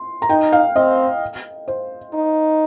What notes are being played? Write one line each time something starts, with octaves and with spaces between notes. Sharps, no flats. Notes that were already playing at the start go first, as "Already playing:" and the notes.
Already playing: C6
A#5
D#4 G5
F5
C4 D#5
C5
D#4